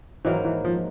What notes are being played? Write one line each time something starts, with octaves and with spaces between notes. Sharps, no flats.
G#2 D#3 E3 F#3 A#3
E3
F3